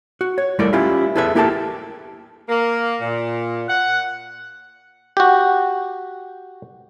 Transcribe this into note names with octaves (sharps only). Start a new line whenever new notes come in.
F#4
C#5
G3 A3 E4 A4 A#4 D5
C#4 E4 F4 G4 E5 F5
E4 G#4 A4 B4 C5 E5
A#3 E4 G4 A4 A#4 A5
A#3
A#2
F#5
F#4 G4